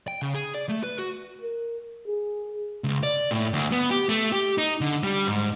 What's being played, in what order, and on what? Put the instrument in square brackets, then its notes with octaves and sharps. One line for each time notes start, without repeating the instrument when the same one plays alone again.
[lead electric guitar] G5
C#3
G#4
D5
A3
B4
F#4
[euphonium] A#4
G#4
[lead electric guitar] C#2
D5
A2
D2
B3
G4
A3
G4
D#4
D3
G3
G#2